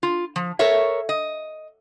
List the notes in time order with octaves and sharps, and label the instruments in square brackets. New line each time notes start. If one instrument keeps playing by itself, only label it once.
[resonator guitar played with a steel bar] F4
F3
A4 A#4 C#5 E5
D#5